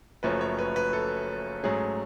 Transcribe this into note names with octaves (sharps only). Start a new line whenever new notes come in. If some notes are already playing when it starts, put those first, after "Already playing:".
F#1 F#2 F3 A3 C#4 B4
C#5
B4
B4
A4
G#2 F#3 A3 C#4 G#4